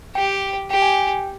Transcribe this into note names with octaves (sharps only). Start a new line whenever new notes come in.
G4 G5
G4 G5
G#5
G5